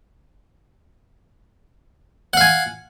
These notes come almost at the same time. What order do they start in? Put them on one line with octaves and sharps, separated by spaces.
F#5 F5 G#5